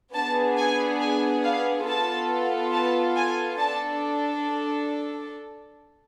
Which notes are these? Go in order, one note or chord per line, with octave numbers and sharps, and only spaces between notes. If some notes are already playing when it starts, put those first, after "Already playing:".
B3 D4 G#4 A5
G#5
G#5
F5
B3 F4 A4 A5
A5
G#5
D4 A4 A5